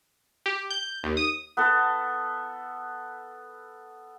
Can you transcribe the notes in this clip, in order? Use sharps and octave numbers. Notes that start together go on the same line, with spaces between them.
G4
G6
D#2
D#6
B3 A4